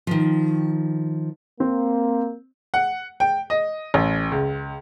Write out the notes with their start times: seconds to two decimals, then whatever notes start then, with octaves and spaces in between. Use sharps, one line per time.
0.07 D#3 F3
1.60 A#3 C4
2.74 F#5
3.20 G5
3.50 D#5
3.94 A1
4.32 C#2